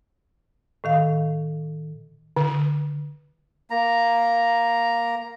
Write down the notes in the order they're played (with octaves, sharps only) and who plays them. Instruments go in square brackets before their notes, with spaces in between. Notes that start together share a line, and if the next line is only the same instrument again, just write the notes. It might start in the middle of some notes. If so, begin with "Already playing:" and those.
[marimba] A2 D#3 F5
[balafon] D3
[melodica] A#3 A#5